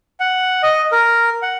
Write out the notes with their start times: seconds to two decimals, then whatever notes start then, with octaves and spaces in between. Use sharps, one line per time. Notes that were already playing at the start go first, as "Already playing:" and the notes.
0.20 F#5
0.63 D#5
0.92 A#4
1.42 F#5